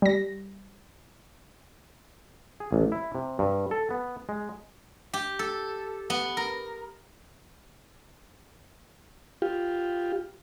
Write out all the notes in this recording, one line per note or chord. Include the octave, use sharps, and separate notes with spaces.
G3 A#6
G#4
A1
E4
C3
G2
A4
B3
G#3
G4
A4
B3
A#4
F4 G4